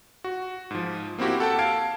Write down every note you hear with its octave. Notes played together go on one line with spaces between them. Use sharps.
F#4
G#2 F3
A#3 C4 E4 F#4 G4
A4 F#5 G5 A5
F5 A5 G#6 D7